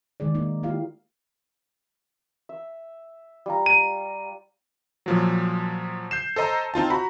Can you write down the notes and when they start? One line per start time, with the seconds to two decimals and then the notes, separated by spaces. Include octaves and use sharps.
0.20 D#3 G#3 G#4 D5
0.35 A#3 D#4
0.63 A#3 E4 F4 G4 F5
2.49 E5
3.46 G3 F4 A#5
3.66 D#7
5.06 A#2 F3 F#3
6.11 G6 C7 E7
6.36 A4 C5 D#5 A#5
6.74 C4 D#4 F4 A5
6.90 F#4 A#5 B5